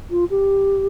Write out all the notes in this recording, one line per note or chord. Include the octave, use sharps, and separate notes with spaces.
F4
G4